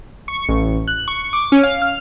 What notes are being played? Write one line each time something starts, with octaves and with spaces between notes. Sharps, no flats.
C#6
A1
F#6
C#6
D6
C#4
F5
F6